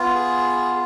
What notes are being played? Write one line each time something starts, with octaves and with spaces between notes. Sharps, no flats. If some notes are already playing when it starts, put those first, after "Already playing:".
Already playing: B3 F4
G#4